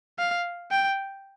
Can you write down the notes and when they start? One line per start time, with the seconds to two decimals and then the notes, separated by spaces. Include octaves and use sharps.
0.19 F5
0.71 G5